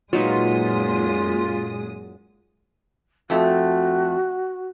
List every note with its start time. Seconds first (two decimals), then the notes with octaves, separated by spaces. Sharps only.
0.13 F#2 A#2 F#3 G#3 D#4 F4 B4 D#6
3.30 F2 A3 F#4